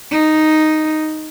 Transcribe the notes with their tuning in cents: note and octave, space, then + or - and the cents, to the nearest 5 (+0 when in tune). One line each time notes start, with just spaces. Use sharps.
D#4 +0